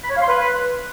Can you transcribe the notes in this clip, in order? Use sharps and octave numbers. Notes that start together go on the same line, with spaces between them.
B5
C#5
F5
C6
B4